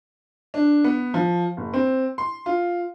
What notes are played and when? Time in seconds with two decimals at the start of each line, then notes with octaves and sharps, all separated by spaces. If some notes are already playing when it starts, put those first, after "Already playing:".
0.54 D4
0.84 B3
1.14 F3
1.57 F#1
1.74 C4
2.18 C6
2.46 F4